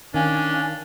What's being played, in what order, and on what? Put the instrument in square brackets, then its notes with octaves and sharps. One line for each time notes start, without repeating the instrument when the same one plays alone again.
[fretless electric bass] D#3 [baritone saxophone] C#4 [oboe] D4 [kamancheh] F5 G#5